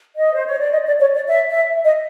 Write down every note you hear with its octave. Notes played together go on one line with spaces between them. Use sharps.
D#5
C5
C#5
D5
D#5
D5
C#5
D5
E5
E5
D#5